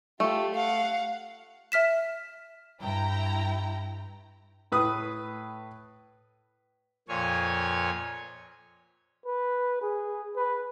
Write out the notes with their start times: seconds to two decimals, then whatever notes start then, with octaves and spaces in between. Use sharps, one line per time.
0.20 A3 F4 G4
0.55 F5 F#5
1.72 E5 F6 B6 E7
2.81 G2 E4 G5 A#5
4.72 A2 B4 D#6
7.08 F2 A#2 C#5 G#5
9.26 B4
9.82 G#4
10.36 B4